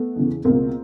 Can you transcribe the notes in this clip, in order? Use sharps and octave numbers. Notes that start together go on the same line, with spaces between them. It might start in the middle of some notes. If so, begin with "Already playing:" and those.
Already playing: A3 B3
E2 C#3 E3
C#2 B2 A#3 C4